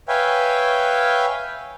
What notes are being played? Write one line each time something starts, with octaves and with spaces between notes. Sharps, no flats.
B4 C#5 E5 F5 G5 G#5